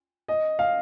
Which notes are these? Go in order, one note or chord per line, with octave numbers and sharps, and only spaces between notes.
D#5
F5